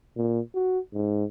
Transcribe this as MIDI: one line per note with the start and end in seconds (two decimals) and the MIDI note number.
0.16 0.40 46
0.55 0.79 66
0.93 1.25 44